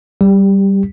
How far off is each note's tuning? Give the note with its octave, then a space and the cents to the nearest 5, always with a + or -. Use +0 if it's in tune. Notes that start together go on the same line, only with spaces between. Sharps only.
G3 -5 G4 +20